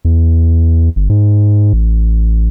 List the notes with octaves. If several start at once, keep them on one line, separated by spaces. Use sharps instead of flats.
E2
G1
G#2
A1